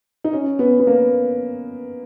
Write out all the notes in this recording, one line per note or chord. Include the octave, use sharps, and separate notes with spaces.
D#4
C#4
B3
B3
A#3